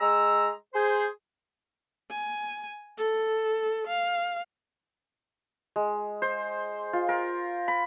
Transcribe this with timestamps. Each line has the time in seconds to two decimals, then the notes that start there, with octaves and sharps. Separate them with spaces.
0.01 G#3 A#5 E6
0.74 G#4 C5
2.10 G#5
2.98 A4
3.87 F5
5.76 G#3
6.22 C5
6.93 F4
7.09 A#4
7.68 B5